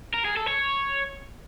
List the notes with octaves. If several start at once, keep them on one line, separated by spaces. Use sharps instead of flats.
A#4
G#4
A4
C#5